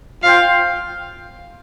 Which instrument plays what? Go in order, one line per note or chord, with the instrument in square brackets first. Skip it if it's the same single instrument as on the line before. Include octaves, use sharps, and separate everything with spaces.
[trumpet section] F4 C5 G5 [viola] F5